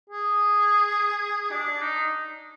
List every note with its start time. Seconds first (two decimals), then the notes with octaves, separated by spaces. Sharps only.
0.10 G#4
1.52 D4
1.82 D#4